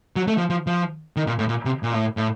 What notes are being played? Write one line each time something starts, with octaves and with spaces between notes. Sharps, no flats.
F#3
A3
F3
F3
F3
D#3
A#2
A2
A#2
C3
A#2
A2
A2